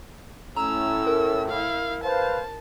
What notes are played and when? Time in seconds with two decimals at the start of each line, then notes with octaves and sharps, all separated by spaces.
0.56 A2 C#4 A#5 E6
1.07 A#4
1.48 E4 F5
2.04 B4 C5 F5 A5